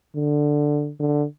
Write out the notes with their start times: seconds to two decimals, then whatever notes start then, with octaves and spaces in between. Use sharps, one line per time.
0.15 D3
0.99 D3